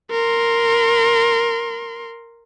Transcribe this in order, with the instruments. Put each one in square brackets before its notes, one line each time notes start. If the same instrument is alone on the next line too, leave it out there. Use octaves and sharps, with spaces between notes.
[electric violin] A#4 C6